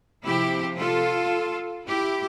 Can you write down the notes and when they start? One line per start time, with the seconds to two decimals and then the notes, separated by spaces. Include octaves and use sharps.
0.23 C3 F3 E4 G4
0.78 F4 A4
1.86 E4 G4